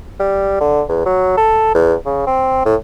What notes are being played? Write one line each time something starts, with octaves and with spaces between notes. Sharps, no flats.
G3
D3
E2
F#3
A4
E2
C#3
C4
A2